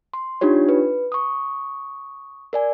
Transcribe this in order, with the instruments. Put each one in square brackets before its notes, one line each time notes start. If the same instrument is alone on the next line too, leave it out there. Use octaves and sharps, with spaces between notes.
[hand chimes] C6
D4 D#4 F4 G4 C#5
B4
C#6 D#6
A#4 D5 G#5